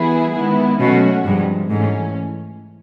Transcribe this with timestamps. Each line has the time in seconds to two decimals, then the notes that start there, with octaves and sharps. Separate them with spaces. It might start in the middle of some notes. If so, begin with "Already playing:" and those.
Already playing: E3 G3 B3 E4 G#4
0.34 D#3 G#3 B3 E4
0.79 B2 F#3 A3 C#4 F#4
1.25 G2 C3 F3 G#3
1.69 G#2 E3 A3 C#4